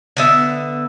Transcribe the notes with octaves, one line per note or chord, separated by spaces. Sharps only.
D3 B3 E5